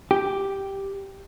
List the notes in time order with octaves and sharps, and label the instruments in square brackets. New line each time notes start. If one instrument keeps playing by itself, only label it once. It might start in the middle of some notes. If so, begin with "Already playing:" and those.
[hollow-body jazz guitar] G4